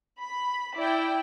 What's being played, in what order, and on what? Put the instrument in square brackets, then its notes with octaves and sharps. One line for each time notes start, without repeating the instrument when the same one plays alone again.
[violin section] B5
E4 D5 G5